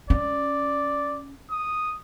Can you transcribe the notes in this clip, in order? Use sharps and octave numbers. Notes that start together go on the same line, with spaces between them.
C#4 D5
D#6